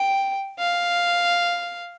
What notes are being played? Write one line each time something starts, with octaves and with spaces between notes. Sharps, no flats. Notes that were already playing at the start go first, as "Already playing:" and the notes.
Already playing: G5
F5